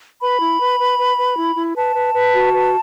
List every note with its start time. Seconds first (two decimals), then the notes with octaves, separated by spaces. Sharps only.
0.21 B4 B5
0.40 E4
0.60 B4
0.79 B4
0.98 B4
1.18 B4
1.37 E4
1.57 E4
1.76 B4 A5
1.95 B4
2.15 B4
2.34 F#4
2.54 B4